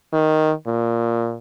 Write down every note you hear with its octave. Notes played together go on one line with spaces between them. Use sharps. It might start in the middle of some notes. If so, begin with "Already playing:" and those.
D#3
A#2